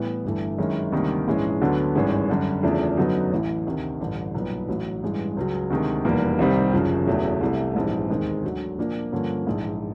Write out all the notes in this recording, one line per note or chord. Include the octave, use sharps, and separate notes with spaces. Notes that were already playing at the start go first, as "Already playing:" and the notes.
Already playing: A2 E3 G3 B3
G1 G2 E3 A3
F#2 D#3 G#3 C#4 E4
D2 C3 D#3 G3 A#3
A#1 G#2 E3 G#3 C#4
D2 D3 F#3 B3
G#1 G2 E3 G#3 C#4
F#2 D3 G3
E2 C#3 F3 A3 D4
F#2 D3 F#3 B3 D#4
A1 A2 E3
D2 C3 D#3
A1 G2 D3 G3
B1 A#2 G3 B3
A1 A2 F#3
A1 G2 E3 G#3
C#2 C#3 F#3
D2 C3 D#3 G#3
F1 E2 B2 G3 A#3
C2 C3 D#3 G3 C4
F#1 F#2 C#3 F3
E1 E2 C#3 F#3 A3
C2 C3 E3 A3
A#1 G#2 E3 G3 C4
E1 D#2 D#3 G#3 C4
D2 D3 F#3
A#2 F3 A#3 D4
G2 D3 F3 A#3 C#4
A#1 G#2 E3